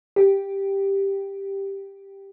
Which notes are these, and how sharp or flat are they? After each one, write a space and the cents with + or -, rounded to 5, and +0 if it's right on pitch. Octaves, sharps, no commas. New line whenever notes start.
G4 +0